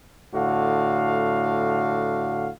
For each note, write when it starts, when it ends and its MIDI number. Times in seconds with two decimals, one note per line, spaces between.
0.34 2.50 45
0.34 2.50 50
0.34 2.50 66
0.34 2.50 77